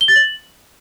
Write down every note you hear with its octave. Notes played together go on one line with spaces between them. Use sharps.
G7
A6
F#7